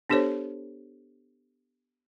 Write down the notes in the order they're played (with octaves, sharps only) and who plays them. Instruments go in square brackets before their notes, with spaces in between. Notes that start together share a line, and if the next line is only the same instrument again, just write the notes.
[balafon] B3 D4 G4 A4 C5 C#5